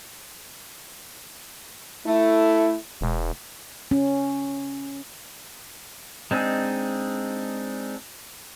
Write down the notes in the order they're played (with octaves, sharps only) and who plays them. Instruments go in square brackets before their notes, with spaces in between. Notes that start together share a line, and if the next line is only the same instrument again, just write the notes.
[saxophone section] A3 [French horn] E4
[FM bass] E1
[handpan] C#4
[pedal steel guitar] G#3 C4 D4 D#4 G#4